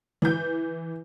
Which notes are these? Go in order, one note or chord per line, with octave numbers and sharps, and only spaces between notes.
E3 G6